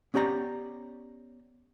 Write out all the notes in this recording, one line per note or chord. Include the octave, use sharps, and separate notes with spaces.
B3 C#4 G4 D5 A#5